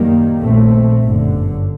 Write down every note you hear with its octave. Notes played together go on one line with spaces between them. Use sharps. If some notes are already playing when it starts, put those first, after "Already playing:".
Already playing: F#2 D#3 G3 A#3
A#1 A#2 A3 C4
G1 F#2 D3